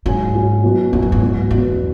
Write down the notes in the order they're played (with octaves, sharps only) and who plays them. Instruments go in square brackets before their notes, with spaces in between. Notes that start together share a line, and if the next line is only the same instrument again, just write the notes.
[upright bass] G#2 [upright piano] F#3 C#4 F#4
[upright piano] F#3 C#4 F#4
B2 F#3 C#4 F#4
[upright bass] E2 [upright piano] B2 F#3 C#4 F#4
[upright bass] F#2
G#2
[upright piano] B2 F#3 B3 F#4
[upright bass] E2 [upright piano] B2 F#3 B3 F#4